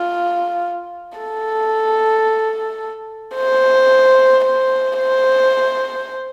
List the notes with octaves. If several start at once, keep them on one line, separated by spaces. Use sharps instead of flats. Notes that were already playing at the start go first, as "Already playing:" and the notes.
Already playing: F4
A4
C5
C5
C5